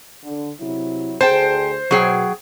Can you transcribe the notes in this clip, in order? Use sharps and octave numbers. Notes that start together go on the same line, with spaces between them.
D3
C3 F#3 E4
D2 G#4 C5 G5 A5
B2 F#3 G#4 G5